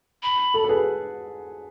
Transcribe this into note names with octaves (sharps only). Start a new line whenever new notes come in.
B5
A4
A4
G#4 B4